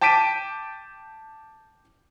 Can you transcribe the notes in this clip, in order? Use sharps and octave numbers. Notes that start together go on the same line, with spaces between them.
G5 A5 D6 B6 D7 D#7